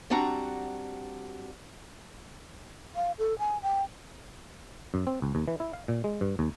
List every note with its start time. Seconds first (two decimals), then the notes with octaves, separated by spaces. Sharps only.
0.10 G3 C4 D4 F#4 F#5 A#5
2.96 F5
3.19 A4
3.39 G#5
3.63 G5
4.94 F#2
5.07 C4
5.22 C#2
5.35 D#2
5.48 E3
5.60 E4
5.73 F5
5.88 A#2
6.04 G#3
6.21 G2
6.39 D#2